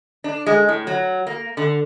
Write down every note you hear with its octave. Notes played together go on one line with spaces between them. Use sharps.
D4
G#3
A2
F#3
A#3
D3